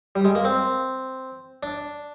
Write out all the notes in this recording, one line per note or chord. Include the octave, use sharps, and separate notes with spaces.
G3
G#3
A#3
C4
D4